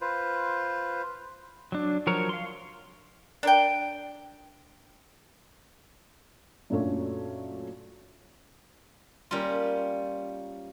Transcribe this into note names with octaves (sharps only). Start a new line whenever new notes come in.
F4 B4 C5
F#3 D4
F3 F#3 A#4 C#5
F5 C6
D4 A#4 G5
F#2 A#2 F#3 A3 C#4 D4
G3 A#3 C#4 F4